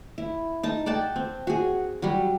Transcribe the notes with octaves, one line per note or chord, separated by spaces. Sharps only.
E4
D#4 A5
D5 F#5 G5 A5
C4
F#4 G#4
F#3 G3